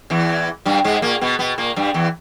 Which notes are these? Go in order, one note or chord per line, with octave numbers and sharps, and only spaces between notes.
E2 E3
G2 G3
G#2 G#3
A#2 A#3
B2 B3
B2 B3
A#2 A#3
G2 G3
E2 E3